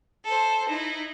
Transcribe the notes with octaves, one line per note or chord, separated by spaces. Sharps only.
A4 C5
D#4 E4